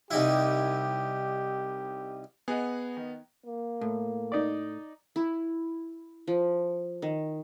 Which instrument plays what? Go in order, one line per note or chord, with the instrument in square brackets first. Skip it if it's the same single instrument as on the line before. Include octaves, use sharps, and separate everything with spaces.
[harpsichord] C2 D#4 E4 [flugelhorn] G4
[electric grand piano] B3 [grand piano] G#4 D#5 F#5
[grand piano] D#3
[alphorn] A#3
[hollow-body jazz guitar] A2
[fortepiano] D#4 D5
[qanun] E4
F3
D#3